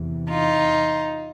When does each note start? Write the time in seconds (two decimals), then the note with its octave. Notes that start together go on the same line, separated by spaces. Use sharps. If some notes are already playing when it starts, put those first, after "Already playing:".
Already playing: E2 C3 E3
0.30 D#4 F4